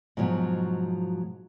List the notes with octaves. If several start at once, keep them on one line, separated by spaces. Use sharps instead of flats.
G#2 B2 F3 F#3 G#3